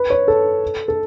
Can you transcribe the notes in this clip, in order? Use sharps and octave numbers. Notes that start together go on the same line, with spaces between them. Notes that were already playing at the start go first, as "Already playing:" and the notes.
Already playing: B4
C#5
A4
A4